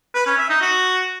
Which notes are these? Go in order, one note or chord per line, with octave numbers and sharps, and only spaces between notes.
B4
C#4
E5
D#4
F#4